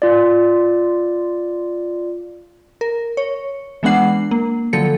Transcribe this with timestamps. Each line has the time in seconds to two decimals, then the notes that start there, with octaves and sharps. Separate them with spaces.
0.02 F4 D5
2.81 A#4
3.17 C#5
3.83 E3 G#3 B3 D4 F#5 C7
4.31 A#3
4.73 D3 F3 F#3 A4 C#7